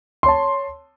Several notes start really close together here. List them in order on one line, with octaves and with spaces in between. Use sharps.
C6 C#5 A5